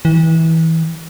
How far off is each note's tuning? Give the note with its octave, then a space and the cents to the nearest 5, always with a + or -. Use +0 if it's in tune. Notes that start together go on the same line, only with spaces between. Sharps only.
E3 -25